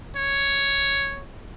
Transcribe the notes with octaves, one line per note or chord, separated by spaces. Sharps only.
C#5